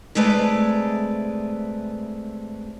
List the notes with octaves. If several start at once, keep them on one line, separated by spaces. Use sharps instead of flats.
C3 G#3 A3 B4 D5